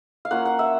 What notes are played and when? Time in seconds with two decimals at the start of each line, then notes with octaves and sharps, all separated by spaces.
0.25 F5
0.31 A#3 C#4 F4 F#5
0.45 F#5
0.59 E5